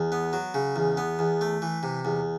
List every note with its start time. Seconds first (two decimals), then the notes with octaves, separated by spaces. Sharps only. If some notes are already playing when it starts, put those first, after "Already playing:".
Already playing: E2
0.12 B3
0.33 F#3
0.54 C#3
0.76 E2
0.97 B3
1.19 E2
1.41 A3
1.62 E3
1.83 C3
2.05 E2